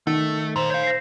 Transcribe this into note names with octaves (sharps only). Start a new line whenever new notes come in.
D#3 A3
A#2 C5 C6 E7
C#5 F5 G6
A#6 C7